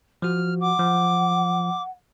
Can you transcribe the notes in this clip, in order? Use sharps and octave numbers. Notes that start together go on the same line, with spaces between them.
F3 F#4 F6
F#5 D6
F3